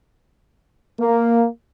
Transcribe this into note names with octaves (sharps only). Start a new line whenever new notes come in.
A#3